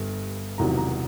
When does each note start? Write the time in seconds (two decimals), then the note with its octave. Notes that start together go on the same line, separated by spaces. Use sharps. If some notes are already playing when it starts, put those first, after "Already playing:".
Already playing: G1 G2
0.58 E1 E2 C3 D#3 F#3 A#5
0.77 A#5